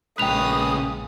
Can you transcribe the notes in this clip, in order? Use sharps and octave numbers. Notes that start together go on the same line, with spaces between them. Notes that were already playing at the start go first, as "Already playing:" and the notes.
A#1 C#3 G#3 B4 G5 D#6 F7